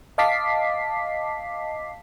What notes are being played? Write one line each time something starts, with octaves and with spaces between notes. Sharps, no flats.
D#5 F5 A5 D6 B6 C7